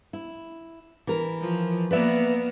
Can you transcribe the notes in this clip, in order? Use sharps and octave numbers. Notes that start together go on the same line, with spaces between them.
E4
E3 A#4
F3
A#3 B3 B4 D5 E5